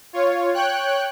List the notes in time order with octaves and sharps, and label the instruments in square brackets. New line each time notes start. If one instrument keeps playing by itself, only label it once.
[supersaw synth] F4 C#5
C#5 G5 F#6